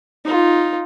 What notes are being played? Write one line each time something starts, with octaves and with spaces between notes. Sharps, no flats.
D#4 F4